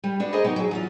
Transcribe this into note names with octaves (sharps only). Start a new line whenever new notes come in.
G3
B3 D4 F#4
G#4 A#4 C5 D#5
B2 F#3 B3 D#4 G5
F#3 G#4
E2 F#3 F4